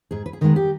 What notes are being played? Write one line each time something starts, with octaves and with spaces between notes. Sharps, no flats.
G#2 G#4
B4
G#4
D#3 G#3 B3 A#4
G4